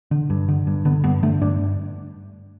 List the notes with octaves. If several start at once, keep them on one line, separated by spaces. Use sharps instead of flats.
D3
G2
D3
G2
D3 B3
G2 B3
D3 A3
G2 D4